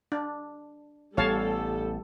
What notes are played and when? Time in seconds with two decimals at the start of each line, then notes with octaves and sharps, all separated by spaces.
0.12 D4
1.17 A1 G3 B3 A4 C#5 F5 A5